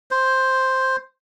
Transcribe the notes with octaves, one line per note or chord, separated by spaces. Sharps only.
C5